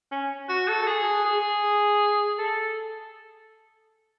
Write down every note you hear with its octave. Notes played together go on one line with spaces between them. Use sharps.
C#4
F#4
A4
A4
G#4
G#4
A4